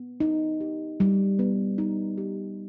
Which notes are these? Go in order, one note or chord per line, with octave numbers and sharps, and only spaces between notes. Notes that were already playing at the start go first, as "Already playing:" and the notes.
Already playing: B3
D#4
G4
G3
B3
D#4
G4